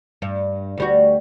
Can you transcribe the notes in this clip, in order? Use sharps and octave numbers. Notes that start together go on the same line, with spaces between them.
G2
D2 G3 F#4